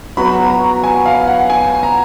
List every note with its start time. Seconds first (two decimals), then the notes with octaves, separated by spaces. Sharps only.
0.17 F#3 B3 F#4 B5
0.50 A#5
0.84 G#5
1.06 F5
1.27 F#5
1.50 G#5
1.83 A#5